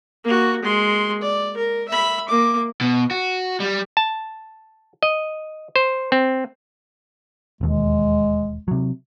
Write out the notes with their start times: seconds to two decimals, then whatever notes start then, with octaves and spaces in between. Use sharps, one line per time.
0.24 A#3 F#4
0.63 G#3 C6
1.22 D5
1.57 A#4
1.89 E5 B5
2.29 A#3 D6
2.81 B2
3.11 F#4
3.60 G3
3.97 A5
5.03 D#5
5.76 C5
6.12 C4
7.61 E1 D#2 G#3
8.68 C3 F#3